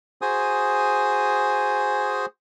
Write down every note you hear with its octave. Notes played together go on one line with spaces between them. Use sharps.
F#4 G#4 C5 G#5 D#6